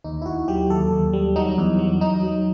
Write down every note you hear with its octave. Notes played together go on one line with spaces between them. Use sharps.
D#2 D#4
E4
D#2 F#4
F#3 G4
D#2 A4
D#2
G3
F#3 D#4
E2
F#3
F#3 D#4
F#3